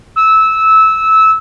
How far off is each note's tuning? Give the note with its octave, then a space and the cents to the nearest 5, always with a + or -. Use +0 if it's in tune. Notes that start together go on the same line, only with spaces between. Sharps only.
E6 -15